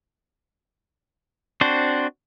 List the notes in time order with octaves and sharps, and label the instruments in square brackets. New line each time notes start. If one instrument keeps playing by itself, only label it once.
[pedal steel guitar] C4 D4 F#4 C5